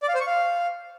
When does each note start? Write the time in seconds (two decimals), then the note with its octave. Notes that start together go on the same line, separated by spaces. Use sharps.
0.03 D5
0.09 F5
0.15 C5
0.21 C#6
0.27 F5